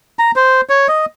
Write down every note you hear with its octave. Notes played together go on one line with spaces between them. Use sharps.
A#5
C5
C#5
D#5